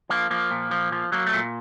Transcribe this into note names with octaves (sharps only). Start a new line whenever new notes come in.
F3 A#3
F3 A#3
A#2
F3
F3
F#3 A#3
A3
A#2